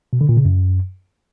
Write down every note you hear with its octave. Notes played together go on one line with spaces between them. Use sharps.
B2
D3
A#2
C#3
F#2